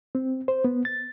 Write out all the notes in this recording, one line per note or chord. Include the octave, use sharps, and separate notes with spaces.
C4
C5
B3
A6